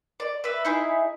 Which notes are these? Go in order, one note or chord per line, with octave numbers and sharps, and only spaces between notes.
D5
B4 E5
D#4 E4 G#4